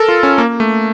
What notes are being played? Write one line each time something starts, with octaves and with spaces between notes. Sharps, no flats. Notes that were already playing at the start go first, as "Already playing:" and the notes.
Already playing: A4 A#4
F4
C#4
A#3
A3